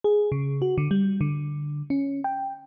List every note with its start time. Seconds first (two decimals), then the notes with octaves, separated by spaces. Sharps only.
0.04 G#4
0.32 C#3
0.62 F#4
0.78 D3
0.91 G3
1.21 D3
1.90 C#4
2.24 G5